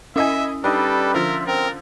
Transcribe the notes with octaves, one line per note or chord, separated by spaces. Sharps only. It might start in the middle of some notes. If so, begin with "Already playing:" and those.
C#4 E4 D#5 E5 G#5 D#6 E6
G3 D4 D#4 G4 A4 B4
D3 F3 F4 A#4 E5
C4 A#4